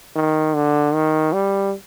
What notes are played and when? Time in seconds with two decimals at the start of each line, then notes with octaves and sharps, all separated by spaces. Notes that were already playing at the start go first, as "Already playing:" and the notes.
0.16 D#3
0.55 D3
0.94 D#3
1.33 G3